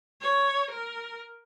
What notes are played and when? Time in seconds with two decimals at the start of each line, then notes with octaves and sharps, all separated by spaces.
0.21 C#5
0.71 A#4